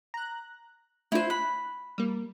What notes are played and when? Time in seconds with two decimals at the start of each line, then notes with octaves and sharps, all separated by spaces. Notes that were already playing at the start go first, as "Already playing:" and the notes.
0.14 A#5 F#6
1.12 A3 D4 E4 F4 C5
1.30 B5 F#6
1.98 G3 A#3